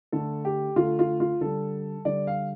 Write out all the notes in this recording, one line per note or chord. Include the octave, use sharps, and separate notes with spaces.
D3 A3 A4
G4
D3 A3 F4
F4
F4
D3 G3 A4
D3 G3 D5
F5